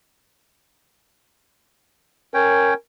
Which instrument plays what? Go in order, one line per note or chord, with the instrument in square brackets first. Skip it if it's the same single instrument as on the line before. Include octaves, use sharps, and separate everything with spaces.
[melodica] C#4 C#5 G5 [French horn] A#4